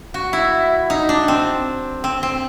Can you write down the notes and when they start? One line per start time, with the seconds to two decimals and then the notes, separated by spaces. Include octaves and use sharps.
0.14 F#4
0.33 E4
0.90 D#4
1.09 D4
1.28 C4
2.04 C4
2.23 C4